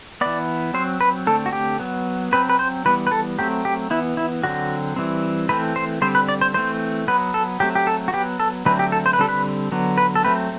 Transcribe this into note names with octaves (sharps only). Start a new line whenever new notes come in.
E3 B3 D5
F#3 C4 C5
B4
D3 A3 C4 A4
F#4
G4
F#3 B3
F#3 C4 B4
B4
C5
E3 G3 B3 B4
B4
A4
F#3 A3 C4 G4
G4
E3 B3 E4
E4
D3 F#3 C4 F#4
E3 G3 C4
E3 A3 C4 B4
C5
D3 G3 C4 C5
B4
D5
C5
E3 A3 C4 C5
F#3 B3 B4
A4
F#3 A3 C4 G4
G4
A4
F#4
F#3 B3 G4
A4
D3 F#3 A3 C4 B4
G4
A4
C5
B4
D3 G3 C4 A4
B4
D3 F#3 B3
B4
A4
F#3 A3 C4 B4